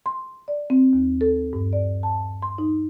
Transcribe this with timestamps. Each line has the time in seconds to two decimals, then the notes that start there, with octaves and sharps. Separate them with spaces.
0.06 C6
0.48 D5
0.70 C4
0.93 D#2
1.21 A4
1.53 G2
1.73 D5
2.03 A5
2.42 C6
2.58 D#4